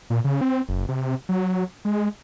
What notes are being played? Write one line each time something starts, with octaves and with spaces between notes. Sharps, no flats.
A#2
C#3
C4
F#1
C3
F#3
G#3